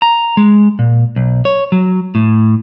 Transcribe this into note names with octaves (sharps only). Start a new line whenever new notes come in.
A#5
G#3
A#2
B1
C#5
F#3
A2